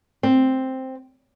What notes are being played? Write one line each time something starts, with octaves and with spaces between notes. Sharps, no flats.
C4